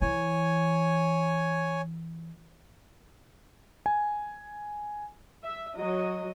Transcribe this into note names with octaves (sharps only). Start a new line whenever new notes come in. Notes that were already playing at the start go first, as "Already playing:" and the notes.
E3 C#5 G#5
G#5
E5
F#3 D#5